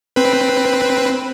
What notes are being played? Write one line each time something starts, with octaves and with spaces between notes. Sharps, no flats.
C4 B4